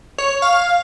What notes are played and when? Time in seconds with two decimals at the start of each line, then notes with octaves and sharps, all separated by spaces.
0.18 C#5
0.42 F5